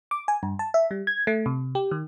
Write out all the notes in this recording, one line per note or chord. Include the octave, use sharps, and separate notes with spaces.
D6
G#5
G2
A5
E5
G3
G#6
A3
C3
G4
D#3